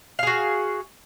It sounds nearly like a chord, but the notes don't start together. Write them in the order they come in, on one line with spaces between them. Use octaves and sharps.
F5 G#4 F#4